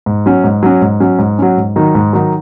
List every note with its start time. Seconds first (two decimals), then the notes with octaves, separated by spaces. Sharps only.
0.06 G#2
0.26 F#3 C#4
0.44 G#2
0.63 F#3 C#4
0.81 G#2
1.00 F#3 C#4
1.19 G#2
1.39 F#3 C#4
1.57 G#2
1.76 D#3 F#3 D#4
1.95 G#2
2.13 D#3 F#3 D#4